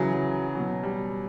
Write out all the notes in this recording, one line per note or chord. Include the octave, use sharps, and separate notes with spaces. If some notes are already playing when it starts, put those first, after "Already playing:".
Already playing: C#3 E3 F#3
F#3
B2 F#3
G3